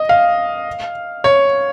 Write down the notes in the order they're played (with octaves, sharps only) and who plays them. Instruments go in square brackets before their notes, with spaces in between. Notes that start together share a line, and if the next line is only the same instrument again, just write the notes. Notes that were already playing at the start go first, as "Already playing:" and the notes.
Already playing: [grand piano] D#5
F5
C#5